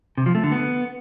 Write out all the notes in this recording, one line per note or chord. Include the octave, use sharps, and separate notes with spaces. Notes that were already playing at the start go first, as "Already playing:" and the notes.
C3
F3
A3
D3
B3